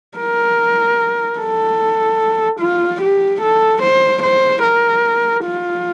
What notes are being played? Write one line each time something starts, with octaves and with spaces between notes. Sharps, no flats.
A#4
A4
F4
G4
A4
C5
C5
A#4
F4